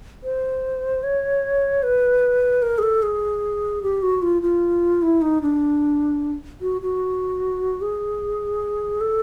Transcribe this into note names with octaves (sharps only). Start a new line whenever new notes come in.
C5
C#5
B4
A#4
G#4
A4
G#4
G4
F#4
F4
F4
E4
D#4
D4
F#4
F#4
G#4
A4